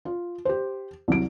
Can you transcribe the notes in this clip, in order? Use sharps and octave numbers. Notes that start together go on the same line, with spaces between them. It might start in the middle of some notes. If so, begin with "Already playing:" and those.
F4
G4 C5
C2 F#3 D7